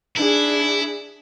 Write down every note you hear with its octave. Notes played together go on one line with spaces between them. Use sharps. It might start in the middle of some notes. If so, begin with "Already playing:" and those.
D4 E4 G#4